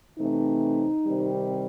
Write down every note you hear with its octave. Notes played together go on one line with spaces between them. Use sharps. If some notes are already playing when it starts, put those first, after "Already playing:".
C3 E3 A3 C4 D#4
C3 D#3 G3 C4